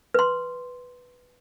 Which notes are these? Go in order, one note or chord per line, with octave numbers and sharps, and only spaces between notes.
B4 C6